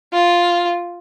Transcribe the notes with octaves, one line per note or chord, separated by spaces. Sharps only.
F4